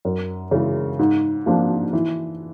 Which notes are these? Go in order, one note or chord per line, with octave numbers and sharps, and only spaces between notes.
F#2
C#3 E3 G#3
G#2
F3 A#3 D4 F4
E3